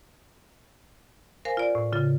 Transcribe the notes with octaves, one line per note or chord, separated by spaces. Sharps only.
A#4 C5 F5 G#5
F4 D5
A2
C#3 F4 A6